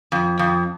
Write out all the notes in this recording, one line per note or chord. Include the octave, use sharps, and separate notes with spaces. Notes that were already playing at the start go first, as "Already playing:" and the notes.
F2
F2